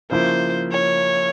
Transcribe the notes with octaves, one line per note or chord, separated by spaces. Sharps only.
C#3 F3 A#3 E4 C5
C#5